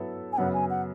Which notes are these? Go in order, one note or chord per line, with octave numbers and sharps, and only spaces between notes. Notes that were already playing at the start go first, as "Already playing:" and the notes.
Already playing: F#3 B3 E4 A4
G#5
F#2 C#3 F#3 B3 F#5
G#5
F#5